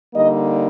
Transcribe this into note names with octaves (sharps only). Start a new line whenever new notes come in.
D3 G3 A#3 D#4 D#5